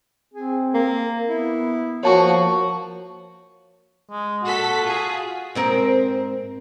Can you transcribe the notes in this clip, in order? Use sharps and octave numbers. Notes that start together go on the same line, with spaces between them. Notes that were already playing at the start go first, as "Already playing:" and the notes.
C4 G#4
A#3
B3 E4
F3 A#3 F#4 C#5 A5 C#6
G#3
A#2 F#4 A4 B6
F4 G#4
G#2 C4 A#4